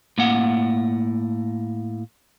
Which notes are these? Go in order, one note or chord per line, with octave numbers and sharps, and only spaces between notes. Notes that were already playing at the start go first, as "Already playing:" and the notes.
A2 A#3 F#5